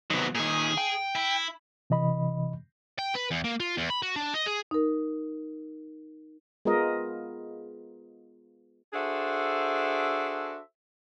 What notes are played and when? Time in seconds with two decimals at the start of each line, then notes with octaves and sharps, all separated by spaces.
0.10 C3 D#3 F#3 B3
0.35 A#2 D#3 G#4
0.78 G5
1.15 E4
1.90 C3 E3 D#5 B5
2.99 G5
3.15 B4
3.31 E2
3.44 A#3
3.60 F4
3.77 E2
3.90 B5
4.03 F#4
4.16 D4
4.34 D#5
4.47 G#4
4.71 D#4 A#4
6.65 G#3 B3 F4 A#4 D#5
8.94 D4 F#4 G#4 A4 C5 E5